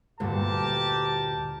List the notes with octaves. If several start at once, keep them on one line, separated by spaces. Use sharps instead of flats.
D2 G2 A#2 G4 A#4 A5